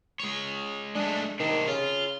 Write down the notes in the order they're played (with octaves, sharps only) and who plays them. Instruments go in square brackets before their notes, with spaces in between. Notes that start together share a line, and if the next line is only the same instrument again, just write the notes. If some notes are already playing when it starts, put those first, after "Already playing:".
[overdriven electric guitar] G#3 C#5
[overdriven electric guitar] G#3 A3 [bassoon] D4
[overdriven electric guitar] C3 D4 [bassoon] D#3
[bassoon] C#3 [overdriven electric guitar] F4